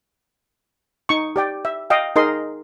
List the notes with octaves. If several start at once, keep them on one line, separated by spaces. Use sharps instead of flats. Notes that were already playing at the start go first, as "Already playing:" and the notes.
D#4 C#6
G4 D5 G5
E5
D#5 F5 G5
D#4 G#4 A#4 D#5 C6